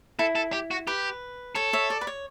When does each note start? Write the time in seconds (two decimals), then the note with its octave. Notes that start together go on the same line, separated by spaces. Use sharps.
0.19 E4 A4
0.35 A4
0.53 G4
0.71 F#4
0.87 G4 B4
1.55 A4 C#5
1.73 C#5 E5
1.90 D5
2.01 B4
2.07 C#5